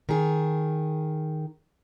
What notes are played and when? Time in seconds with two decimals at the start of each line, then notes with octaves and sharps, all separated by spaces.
0.09 D#3 G#4